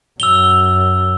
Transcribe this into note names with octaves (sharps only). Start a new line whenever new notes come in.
F#2 E6 F7 G7